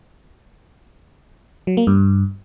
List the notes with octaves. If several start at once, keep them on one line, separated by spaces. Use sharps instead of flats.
F#3
A#3
G2